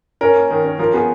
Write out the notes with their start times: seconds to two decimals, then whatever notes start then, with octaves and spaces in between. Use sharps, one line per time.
0.21 C#4 A#4
0.35 A#3
0.50 D#3
0.65 C#4
0.79 F3 A#4
0.93 B3 G#4